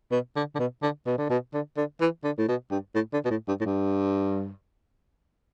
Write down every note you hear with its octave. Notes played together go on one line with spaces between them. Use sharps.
B2
D3
D3
B2
D3
B2
D3
B2
D3
D3
E3
D3
A2
B2
G2
A2
D3
B2
A2
G2
A2
G2